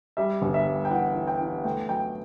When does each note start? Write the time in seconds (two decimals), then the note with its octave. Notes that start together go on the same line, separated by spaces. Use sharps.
0.17 G3 E5
0.42 G1
0.54 E5
0.67 G3
0.85 G5
0.90 E3 F#5
1.15 E3
1.27 G5
1.41 E3
1.64 A3 G5
1.89 F#3 G5